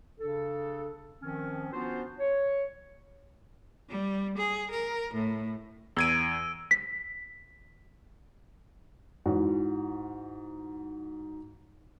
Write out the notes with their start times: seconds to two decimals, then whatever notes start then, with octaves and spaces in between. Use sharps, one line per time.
0.20 C#3 D4 A4
1.22 D#3 F3 C4 C#4
1.73 B3 C#4 D4 F4 F#4 C5
2.19 C#5
3.89 G3
4.37 G#4
4.71 A#4
5.14 A2
5.97 E2 E6 G#6 D7 D#7
6.71 B6
9.26 G#2 E3 F#4